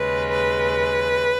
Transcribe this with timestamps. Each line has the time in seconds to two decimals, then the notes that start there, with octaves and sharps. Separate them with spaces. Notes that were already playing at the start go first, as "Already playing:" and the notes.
Already playing: D#2 C#3 G#3 B4
0.31 B4